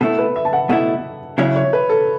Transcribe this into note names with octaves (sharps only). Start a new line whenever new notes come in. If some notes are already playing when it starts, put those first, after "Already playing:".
B2 A3 E4 A4
B4
E5
A5
F#5
B2 A3 E4 F#5
C#3 F#3 C#4 E4 E5
C#5
B4
A4